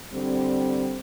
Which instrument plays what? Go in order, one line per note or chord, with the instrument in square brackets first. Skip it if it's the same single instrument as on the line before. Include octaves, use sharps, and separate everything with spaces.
[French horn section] D3 G3 C4